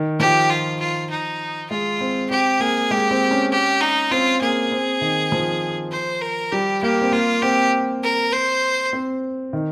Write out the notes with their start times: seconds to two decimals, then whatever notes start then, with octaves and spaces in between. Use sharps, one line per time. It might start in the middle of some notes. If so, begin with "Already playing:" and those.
Already playing: D#3
0.19 F3 G4
0.50 F4
0.79 F4
1.10 D#4
1.70 G#3 F4
2.00 C4
2.30 C4 G4
2.60 A#3 G#4
2.91 G#3 G4
3.11 C4
3.31 C#4
3.51 G4
3.81 D#4
4.11 C4 F4
4.41 A#3 G#4
4.72 C4
5.01 D#3
5.32 F3
5.92 C5
6.21 A#4
6.52 G3 G4
6.82 A#3 G4
7.01 C4
7.12 A#3 F4
7.42 C4 G4
8.03 A#4
8.33 C5
8.93 C4
9.53 D#3